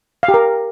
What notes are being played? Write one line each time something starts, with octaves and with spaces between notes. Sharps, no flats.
F5
G4
A#4